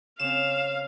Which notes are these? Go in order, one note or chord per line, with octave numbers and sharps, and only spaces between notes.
C#3 C4 F5 E7